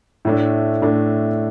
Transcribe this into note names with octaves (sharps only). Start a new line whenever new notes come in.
A2 A3 D4
A2 A3 D4